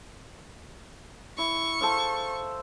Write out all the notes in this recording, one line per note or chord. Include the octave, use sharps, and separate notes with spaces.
E4 C#6
A4 C5 F5